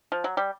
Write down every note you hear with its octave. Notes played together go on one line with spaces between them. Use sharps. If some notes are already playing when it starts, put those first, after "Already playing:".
F3
F#3
G3